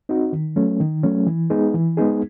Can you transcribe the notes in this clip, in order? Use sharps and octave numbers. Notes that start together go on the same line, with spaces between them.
C4 D#4 F#4
D#3
F#3 A3 C#4
D#3
F#3 A3 C#4
E3
G#3 B3 D#4 G#4
E3
G#3 B3 D#4 G#4